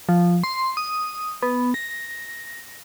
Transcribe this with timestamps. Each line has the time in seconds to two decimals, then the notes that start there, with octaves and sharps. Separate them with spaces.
0.09 F3
0.44 C6
0.77 D#6
1.42 B3
1.74 A#6